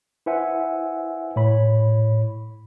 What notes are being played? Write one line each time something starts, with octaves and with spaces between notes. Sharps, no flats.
E4 B4 C5 E5 F#5 G#5
A2 C#5 B5